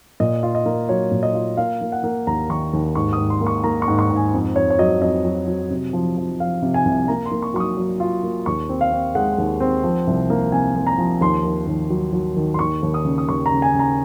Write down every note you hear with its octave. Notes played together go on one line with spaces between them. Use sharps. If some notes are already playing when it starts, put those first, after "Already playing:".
A#2 D#5
F4
D#5
A#3
F#3 C#5
A#2
D#5
F4
A#3 F5
A#3
F#5
A#3
D#2 A#5
D#3 C#6
D#2
G#2 C#6
D#6
G#2
C6
A#3
C#6
A#3 A#5
C#6
G#2
C#6
G#2
G#5
F2
F2 C#5
C#5
F#3 D#5
F2 D#5
F#3
F#3
C3
F3
F3
F3 F5
C3
G#5
C2
A#3 A#5
C6
A#3
C#6
F#3 C#6
D#6
F#3
F4
A#3
D#2 C#6
C4
F5
C4
G#3 F#5
D#2
C4
F3
C2
A#3
C3 G#5
A#3
A#5
F3
D#2 C6
D#3
D#2
F#3
F#3
D#3
C6
D#2 C#6
D#2
D#6
C#3
D#6
D#2 C#6
A#5
C#3
G#5
C#3
A#5